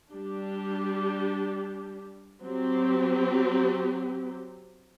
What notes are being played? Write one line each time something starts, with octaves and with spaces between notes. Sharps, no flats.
G3 D4 G4
F#3 C4 G4